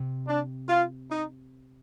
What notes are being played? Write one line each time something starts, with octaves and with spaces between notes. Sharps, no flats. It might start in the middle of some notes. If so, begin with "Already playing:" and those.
Already playing: C3
D4
F4
D#4